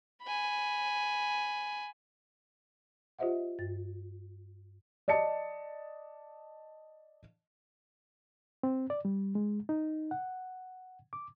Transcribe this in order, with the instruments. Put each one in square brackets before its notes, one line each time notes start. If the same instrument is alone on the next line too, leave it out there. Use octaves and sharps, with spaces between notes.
[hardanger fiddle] G#5 B5
[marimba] F4 G4 C5 D#5 E5 F#5
G2 A6
[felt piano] D5 D#5 A5 C#7
[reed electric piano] C4
D5
G3
G#3
D#4
F#5
D6